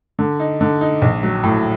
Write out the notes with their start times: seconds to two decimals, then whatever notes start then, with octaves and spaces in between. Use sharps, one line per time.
0.19 D3
0.40 D#4
0.61 D3
0.81 D#4
1.02 A#1
1.23 F#3
1.43 A2